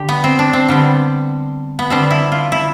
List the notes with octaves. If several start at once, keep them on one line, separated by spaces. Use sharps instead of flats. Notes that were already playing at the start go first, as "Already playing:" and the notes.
Already playing: D3 G4
B3
C4
D4
C4
D3 G3 B3
B3
D3 G3 B3 C4
E4
F4
E4